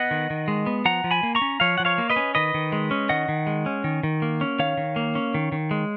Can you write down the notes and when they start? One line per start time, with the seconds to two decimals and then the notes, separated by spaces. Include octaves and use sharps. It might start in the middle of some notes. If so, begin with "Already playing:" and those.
Already playing: B3 D#5 F#5
0.11 D#3
0.30 D#3
0.48 G#3
0.66 B3
0.85 F3 F#5 A#5
1.04 F3
1.11 G#5 B5
1.23 A#3
1.35 A#5 C#6
1.41 C#4
1.60 F3 C#5 F5
1.78 F3 F#5
1.85 C#5 F5
1.98 A#3
2.10 B4 D#5
2.16 C#4
2.35 D#3 B4 D#5
2.54 D#3
2.72 G#3
2.91 C#4
3.09 D#3 D#5 F#5
3.29 D#3
3.47 G#3
3.66 C#4
3.84 D#3
4.03 D#3
4.22 A#3
4.41 C#4
4.59 D#3 C#5 F5
4.77 D#3
4.96 A#3
5.15 C#4
5.34 D#3
5.52 D#3
5.71 G#3